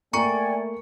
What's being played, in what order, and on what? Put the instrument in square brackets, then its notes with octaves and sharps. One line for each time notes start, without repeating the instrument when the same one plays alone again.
[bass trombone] A3 [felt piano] A#3 C#7 [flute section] D5 G5 G#5 [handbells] A#5 C#6